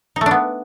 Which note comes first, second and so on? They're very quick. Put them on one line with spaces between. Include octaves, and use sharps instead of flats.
D#4 A3 D4 B3